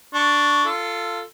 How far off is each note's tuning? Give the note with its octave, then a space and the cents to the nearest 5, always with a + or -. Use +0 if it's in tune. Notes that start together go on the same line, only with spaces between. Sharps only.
D4 +0 C#6 +10
F4 -10 A4 +15